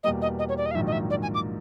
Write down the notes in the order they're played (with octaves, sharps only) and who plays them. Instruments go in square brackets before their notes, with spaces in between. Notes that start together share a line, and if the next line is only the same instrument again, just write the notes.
[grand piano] E2 B2 G3 A#3 [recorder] D#5
[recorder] D#5
D#5
C#5
D5
D#5
F5
[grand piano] A#1 G#2 D#3 F#3 A#3 [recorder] E5
[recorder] D#5
E5
D5
G#5
D6